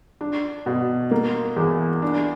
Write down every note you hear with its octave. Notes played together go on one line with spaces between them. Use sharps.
D4
B2
A#3
E2
D4